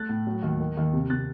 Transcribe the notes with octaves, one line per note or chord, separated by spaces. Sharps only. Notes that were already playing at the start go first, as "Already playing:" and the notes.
Already playing: A3 F#6 A6
A2
F#3
D#2
D#3
D#2
C3
C3 F#6 A6